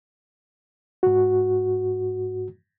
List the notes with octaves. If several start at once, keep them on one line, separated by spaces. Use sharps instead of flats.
G#2 F#4